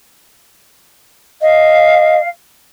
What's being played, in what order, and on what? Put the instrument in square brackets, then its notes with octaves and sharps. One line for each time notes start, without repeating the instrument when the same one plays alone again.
[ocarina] D#5 [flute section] F5